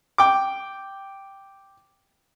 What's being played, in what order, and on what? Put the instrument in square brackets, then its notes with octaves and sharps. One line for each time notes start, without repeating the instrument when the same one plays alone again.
[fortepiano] G5 D6